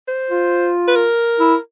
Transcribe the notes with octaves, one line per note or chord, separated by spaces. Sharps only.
C5
F4
B4
A#4
E4